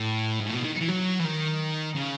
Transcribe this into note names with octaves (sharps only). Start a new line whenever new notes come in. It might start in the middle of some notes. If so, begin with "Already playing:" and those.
Already playing: A2
G#2
A2
B2
D#3
E3
F#3
E3
D#3
C#3